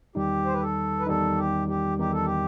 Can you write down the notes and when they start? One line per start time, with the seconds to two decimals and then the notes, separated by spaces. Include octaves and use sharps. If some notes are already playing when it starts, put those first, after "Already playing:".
0.15 E2 D#3 G3 D#4 G4
0.45 C5
0.53 B4
0.61 A4
0.99 B4
1.07 E2 D#3 G3 D#4 A4
1.37 G4
1.68 G4
1.98 E2 D#3 G3 D#4 G4
2.12 A4
2.25 G4